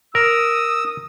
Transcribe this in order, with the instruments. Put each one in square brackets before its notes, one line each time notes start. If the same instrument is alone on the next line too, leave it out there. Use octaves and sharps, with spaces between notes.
[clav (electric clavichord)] A#4 [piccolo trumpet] D#6 [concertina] E6